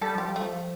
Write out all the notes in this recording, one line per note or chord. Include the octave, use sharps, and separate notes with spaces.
G3 A4
F3 G4
G3
A3
F3